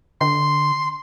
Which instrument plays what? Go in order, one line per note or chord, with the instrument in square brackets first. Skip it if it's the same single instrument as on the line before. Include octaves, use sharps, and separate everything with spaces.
[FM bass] D3 [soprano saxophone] C6